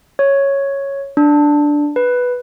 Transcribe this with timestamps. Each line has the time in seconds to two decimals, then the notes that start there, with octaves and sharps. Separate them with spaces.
0.19 C#5
1.17 D4
1.96 B4